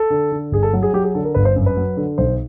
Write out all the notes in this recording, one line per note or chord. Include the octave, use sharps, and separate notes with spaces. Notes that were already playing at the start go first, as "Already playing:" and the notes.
Already playing: A4
D3
D3
G1 G#4
A4
F#3
G#4
F#3 G4
G#4
D3 A4
A#4
G1 B4
C5
F#2
B4
F#3
D3
B1 C5